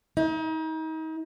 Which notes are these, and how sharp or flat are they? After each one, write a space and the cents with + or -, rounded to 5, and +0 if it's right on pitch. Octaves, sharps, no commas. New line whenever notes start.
D#4 +35